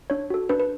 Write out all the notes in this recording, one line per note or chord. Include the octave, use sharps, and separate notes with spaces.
D4 C#5
F#4 A4
D4 B4
B4